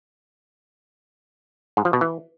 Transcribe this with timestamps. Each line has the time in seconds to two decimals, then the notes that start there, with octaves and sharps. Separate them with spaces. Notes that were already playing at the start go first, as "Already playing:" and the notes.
1.77 G#2
1.85 F3
1.93 B2
2.01 E3